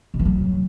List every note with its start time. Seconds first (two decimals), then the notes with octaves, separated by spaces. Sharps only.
0.14 B2
0.19 E3
0.25 F#3